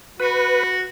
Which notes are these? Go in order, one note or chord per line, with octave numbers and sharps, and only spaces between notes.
F#4 B4